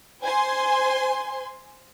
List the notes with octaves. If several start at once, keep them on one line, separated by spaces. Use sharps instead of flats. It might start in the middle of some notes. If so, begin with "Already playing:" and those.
C5 G#5 C6